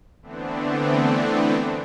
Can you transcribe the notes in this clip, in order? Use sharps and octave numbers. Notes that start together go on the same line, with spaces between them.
D3 E3 A3 B3 C4 D4